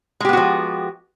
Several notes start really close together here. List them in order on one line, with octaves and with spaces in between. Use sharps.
G#3 G4 B3 F#4 F3